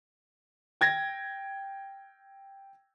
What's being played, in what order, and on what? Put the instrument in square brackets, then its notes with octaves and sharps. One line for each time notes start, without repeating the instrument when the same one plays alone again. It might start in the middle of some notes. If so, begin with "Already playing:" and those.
[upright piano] G5 G#6 A#6